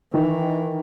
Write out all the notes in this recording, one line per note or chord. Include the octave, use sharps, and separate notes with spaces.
D#3 E3